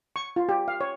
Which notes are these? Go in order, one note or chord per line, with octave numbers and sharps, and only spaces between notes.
C#6
F4
G4
F5
C#5